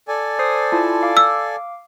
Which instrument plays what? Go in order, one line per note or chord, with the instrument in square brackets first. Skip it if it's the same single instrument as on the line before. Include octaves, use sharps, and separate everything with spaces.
[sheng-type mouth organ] A4 D5 G#5
[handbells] C5 D#6 C7
E4 F4 A5
F5 D6
[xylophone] E6